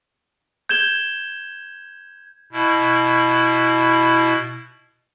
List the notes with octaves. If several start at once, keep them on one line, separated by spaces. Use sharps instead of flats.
G6 G#6 E7 G7
B2 E4